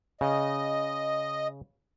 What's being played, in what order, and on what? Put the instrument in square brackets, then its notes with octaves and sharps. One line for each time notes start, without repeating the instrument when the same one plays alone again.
[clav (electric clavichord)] C#3 [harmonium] D#5